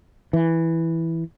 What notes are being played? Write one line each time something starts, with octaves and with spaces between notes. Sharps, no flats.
E3